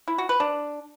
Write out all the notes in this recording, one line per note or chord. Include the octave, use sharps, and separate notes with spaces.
E4
F#4
B4
D4